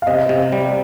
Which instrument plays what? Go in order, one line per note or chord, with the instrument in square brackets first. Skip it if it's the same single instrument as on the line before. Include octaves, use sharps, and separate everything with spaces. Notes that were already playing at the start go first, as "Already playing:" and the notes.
[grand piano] F5
[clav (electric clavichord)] C3 [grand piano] D#5
[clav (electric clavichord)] C3
G3